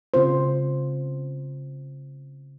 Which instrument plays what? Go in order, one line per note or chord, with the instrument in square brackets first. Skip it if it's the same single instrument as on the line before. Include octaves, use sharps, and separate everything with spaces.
[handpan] C#3 C4 F4 C5